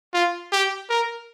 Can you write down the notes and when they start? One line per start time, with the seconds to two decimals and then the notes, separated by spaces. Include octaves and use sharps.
0.13 F4
0.52 G4
0.90 A#4